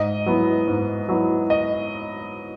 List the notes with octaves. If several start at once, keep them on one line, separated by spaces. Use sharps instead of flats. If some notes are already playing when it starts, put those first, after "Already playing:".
Already playing: G#2 D#5
F#3 B3 E4
G#2
F#3 B3 E4
D#5